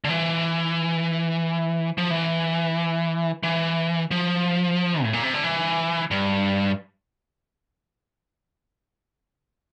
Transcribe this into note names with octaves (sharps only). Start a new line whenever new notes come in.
D3
E3
F3
E3
E3
F3
A2
A#2
C3
D3
E3
G2